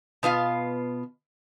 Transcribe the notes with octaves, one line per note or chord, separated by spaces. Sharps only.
B2 B3 F4 F5